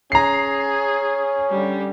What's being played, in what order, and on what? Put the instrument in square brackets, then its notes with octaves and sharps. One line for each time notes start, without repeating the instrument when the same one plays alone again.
[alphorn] C#4 [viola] G#4 [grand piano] A#5 C7
[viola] D3 G3